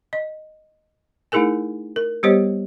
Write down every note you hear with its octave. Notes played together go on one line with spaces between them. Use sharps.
D#5
A3 D#4 E4 G#4 A#4 G#5
A#4
G3 B3 G4 C5 C#5 D#5